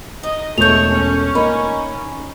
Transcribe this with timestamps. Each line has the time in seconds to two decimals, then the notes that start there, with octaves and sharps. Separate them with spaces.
0.23 D#4 D#5
0.58 E1 A3 G#4 A4 C#5 G6 F7
0.94 C#4
1.35 A#3 D#4 B5